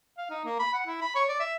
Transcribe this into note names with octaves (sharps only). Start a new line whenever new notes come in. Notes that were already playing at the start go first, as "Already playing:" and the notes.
F5
D#4
A#3
B5
F#5
E4
B5
C#5
D5
E5